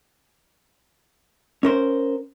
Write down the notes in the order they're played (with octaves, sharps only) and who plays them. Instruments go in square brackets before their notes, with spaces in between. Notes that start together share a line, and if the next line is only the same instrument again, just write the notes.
[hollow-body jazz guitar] C#4 A#4 C5